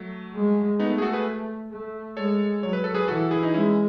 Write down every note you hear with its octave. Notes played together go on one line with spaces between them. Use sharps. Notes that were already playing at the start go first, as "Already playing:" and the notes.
Already playing: F#3 A3
G#3
A3 B3 D#4
G#4
F#4 A4
G#4 B4
A3
G#3 A4 C#5
F#3 C#5
B4
A4
G#4 B4
E3 F#4 A4
E4 G#4
D#4
G#3 C#4 E4